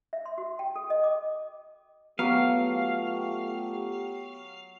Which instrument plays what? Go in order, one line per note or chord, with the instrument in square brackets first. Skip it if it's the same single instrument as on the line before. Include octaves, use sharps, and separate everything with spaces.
[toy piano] E5
C6
F#4
G5
A4
D#5
D6
[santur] F#3 D6 [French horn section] A3 F4 G4 [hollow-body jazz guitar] B3 [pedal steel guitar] F5